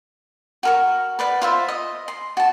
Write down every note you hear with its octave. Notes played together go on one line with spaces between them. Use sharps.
F#4 A#4 C#6
B4 D5 F#5
F4 C5 E5
D#5
C6
F#4 A5